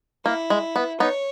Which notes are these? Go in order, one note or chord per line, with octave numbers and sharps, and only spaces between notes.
A#3 E4
G#3
B3
B3 D#4 C#5